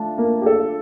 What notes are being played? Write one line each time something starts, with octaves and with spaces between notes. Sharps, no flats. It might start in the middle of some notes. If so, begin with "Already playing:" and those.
Already playing: D3 A3 D4 F4
A#3
G4
A4